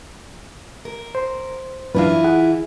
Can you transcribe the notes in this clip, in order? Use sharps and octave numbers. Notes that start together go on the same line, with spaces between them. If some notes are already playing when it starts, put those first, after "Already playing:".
A#4
C5
F#2 E3 D4 E4 F4 B4 F5
G#4 F#5